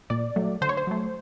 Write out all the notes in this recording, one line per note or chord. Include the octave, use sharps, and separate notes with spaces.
A#2 D5
F#3 A3
D3 C5
C#5
C5
F#3 A3